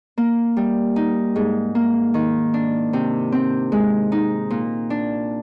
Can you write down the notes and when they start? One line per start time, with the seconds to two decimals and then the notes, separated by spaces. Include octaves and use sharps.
0.18 A#3
0.57 G3
0.96 D#4
1.36 G#2
1.75 A#3
2.14 D#3
2.54 D4
2.93 C3
3.32 C4
3.72 G#3
4.12 D#4
4.50 A#2
4.90 D4